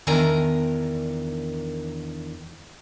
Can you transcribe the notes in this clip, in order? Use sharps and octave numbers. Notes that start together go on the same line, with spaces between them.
E2 D#3 D4 A#4 G#5 A#5